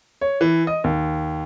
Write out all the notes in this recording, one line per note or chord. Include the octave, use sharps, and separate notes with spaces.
C#5
E3
D#5
D#2